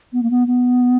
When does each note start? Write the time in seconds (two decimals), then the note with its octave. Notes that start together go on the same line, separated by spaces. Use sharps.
0.13 B3
0.23 A#3
0.30 B3
0.47 B3